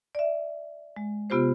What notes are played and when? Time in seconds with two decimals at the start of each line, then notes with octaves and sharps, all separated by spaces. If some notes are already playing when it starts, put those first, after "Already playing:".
0.15 D5 E5
0.96 G#3
1.30 C3 B3 F4 G4 C5